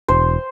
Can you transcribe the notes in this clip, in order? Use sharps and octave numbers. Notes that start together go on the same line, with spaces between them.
E1 C5